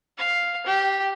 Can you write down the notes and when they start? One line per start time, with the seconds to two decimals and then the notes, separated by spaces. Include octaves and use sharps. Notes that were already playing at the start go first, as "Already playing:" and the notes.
0.18 F5
0.66 G4